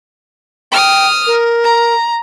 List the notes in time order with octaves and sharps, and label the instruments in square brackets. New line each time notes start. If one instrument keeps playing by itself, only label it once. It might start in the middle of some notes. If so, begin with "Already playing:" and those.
[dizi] G5 [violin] D#6 F6
[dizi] A#4
[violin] A#5